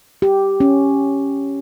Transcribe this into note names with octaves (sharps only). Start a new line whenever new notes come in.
G4
C#4